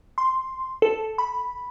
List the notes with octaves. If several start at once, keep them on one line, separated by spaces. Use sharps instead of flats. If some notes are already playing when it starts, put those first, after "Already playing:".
C6
A4
B5